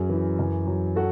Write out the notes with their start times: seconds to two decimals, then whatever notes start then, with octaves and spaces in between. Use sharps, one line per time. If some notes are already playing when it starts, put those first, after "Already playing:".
Already playing: F#2 F#3 G#4
0.09 E3
0.39 F#2
0.67 F#3
0.96 F#4 A4